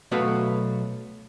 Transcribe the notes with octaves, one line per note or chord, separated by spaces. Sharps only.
B1 A3 B3 F#4 B4 F5